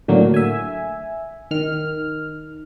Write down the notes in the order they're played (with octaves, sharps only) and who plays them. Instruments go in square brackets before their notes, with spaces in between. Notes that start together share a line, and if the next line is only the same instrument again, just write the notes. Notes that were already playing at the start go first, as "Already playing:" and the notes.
[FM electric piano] A2 D3 F#3 A#3
E5 G#5
D#3 F6